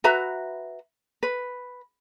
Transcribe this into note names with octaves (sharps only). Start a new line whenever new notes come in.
F#4 B4 E5 A#5
B4